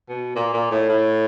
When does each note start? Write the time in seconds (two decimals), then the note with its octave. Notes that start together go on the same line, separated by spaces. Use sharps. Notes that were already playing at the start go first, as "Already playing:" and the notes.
0.09 B2
0.36 A#2
0.54 A#2
0.71 A2
0.89 A2